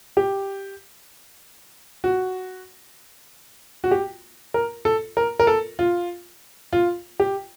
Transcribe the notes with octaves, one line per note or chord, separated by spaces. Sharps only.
G4
F#4
F#4
G4
A#4
A4
A#4
A#4
A4
F4
F4
G4